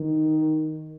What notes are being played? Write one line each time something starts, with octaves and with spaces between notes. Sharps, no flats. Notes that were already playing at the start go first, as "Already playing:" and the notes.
Already playing: D#3